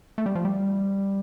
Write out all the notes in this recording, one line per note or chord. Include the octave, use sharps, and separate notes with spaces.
A3
G3
F3
G3